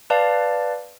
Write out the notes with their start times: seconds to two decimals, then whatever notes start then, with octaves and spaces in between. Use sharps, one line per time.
0.10 B4 D5 F5 A5